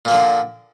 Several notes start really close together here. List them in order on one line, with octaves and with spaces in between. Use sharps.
A#2 A#3 F3 D3